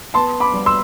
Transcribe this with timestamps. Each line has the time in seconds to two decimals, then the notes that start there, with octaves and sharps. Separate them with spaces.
0.14 B3 A5 C6
0.40 B5 D6
0.53 G3
0.66 C6 E6